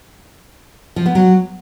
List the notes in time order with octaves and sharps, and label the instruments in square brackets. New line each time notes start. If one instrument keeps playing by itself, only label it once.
[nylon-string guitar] F3
B3
F#3